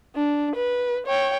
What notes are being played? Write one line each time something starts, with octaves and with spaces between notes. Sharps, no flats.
D4
B4
C#5 G5